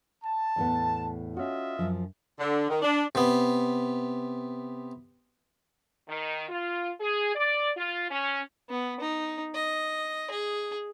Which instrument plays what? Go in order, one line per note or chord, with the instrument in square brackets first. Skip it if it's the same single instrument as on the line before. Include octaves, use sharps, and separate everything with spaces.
[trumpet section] A5
[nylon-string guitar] E2 A2 B3
[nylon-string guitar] C#4 F#4 [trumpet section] F4 D#5 E5
[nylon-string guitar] F#2 F3
[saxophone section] D3
D#3
D4
[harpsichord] C3 B3
[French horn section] D#3
F4
G#4
D5
F4
C#4
[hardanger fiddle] B3
D#4
D#5
G#4